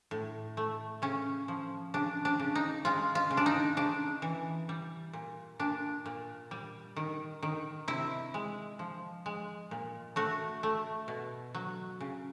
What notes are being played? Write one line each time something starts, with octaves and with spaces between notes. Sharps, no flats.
A2
A3
C#3 C#4
F3
C#3 D4
D4
C#3
D#4
G#3 F4
F4
C#3
D4
D#4
C#3 D4
E3
G3
A#2
A#2 D4
A#2
G3
D#3
D#3
C3 E4
G#3
F3
G#3
A#2
A3 F#4
A3
B2
F#3
C#3